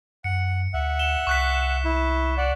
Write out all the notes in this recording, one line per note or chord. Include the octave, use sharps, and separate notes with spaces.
F#2 F#5 C#7
D2 E5 F#5
E7 G7
C2 C#6 F#6 B6
E4
D5 F#5